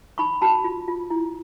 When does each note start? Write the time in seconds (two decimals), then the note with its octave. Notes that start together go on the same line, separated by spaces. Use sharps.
0.18 D#4 B5 C#6
0.41 F#4 A5 B5
0.64 F4
0.88 F4
1.10 E4